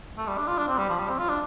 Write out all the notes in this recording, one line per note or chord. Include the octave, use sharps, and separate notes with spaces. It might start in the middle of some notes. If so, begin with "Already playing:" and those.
A3
G3
D4
F4
D4
C4
G3
F3
G3
C4
F4
D4